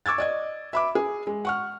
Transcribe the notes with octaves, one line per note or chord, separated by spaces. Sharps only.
C#6 D6 E6 G#6 A6
D5 D#5 G#6
E5 B5 D6
G#4
G#3
F#5 C#6 F6